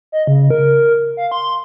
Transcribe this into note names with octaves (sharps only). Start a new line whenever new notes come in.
D#5
C#3
A#4
F5
C6